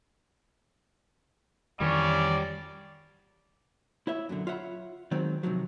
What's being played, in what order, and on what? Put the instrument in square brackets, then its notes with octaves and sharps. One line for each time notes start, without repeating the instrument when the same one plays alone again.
[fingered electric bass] F2 D#3 E3 [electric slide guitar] G3 C#5 [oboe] C#4 [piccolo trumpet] D5
[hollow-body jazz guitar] E4 C#5 E5
F#2 A#2 D3
F4 C#5 E5 F#5 B5
D#3 F#3 G#3 C4
C3 D#3 F3 F#3